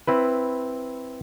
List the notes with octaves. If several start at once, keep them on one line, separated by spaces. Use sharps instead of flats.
C4 E4 B4